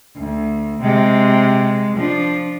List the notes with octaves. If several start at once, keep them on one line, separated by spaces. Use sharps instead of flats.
D2
C3 G#3
F3 D4